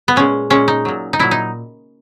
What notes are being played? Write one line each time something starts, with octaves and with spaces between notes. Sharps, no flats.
B3
A#2 G#3 C#4
A#2 G#3 C#4
D#4
A#2 F#3
D#4
A#2 F#3 E4
D#4